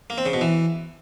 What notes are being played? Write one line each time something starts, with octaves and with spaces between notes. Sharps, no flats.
A#3
C4
C#3
B2
E3